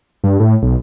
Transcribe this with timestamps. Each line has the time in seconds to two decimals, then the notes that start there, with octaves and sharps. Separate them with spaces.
0.24 G2
0.40 A2
0.62 B1